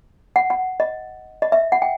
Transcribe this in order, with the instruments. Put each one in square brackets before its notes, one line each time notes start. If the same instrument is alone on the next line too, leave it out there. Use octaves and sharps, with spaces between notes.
[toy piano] F#5
F#5
D#5
D#5
E5
F#5
G5